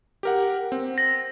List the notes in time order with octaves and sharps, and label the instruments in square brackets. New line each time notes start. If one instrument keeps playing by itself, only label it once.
[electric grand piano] G4 A#4 F#5
C4
[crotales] A#6